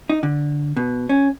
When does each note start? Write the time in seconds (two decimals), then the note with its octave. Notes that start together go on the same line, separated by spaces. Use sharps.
0.10 D#4
0.23 D3
0.77 B2
1.09 C#4